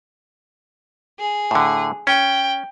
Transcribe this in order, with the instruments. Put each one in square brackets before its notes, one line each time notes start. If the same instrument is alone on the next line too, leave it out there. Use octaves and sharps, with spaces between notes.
[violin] G#4
[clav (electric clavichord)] A2 D3
[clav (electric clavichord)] C#4 [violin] G5